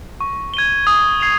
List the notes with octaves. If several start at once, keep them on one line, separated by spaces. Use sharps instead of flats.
C#6
G#6 D#7 G7
D#6
G#6 C7 F7